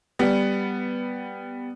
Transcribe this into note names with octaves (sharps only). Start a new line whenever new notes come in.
G3 B3